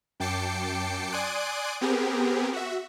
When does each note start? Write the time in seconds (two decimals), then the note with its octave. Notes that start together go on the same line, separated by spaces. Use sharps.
0.20 F#2 G5 A5 D6 C7 C#7
1.12 D5 G#5 C6 D#6 F#6 D7
1.81 B3 C4 G4 G#4 A#4
2.53 F#4 E5